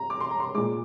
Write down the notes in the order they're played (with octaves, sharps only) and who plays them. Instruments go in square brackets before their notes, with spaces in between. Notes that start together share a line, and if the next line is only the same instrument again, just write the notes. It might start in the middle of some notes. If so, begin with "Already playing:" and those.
Already playing: [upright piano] A#5
D6
C6
A#5
C6
A#2 G#3 D6